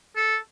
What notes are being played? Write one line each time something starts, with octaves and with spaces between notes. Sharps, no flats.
A4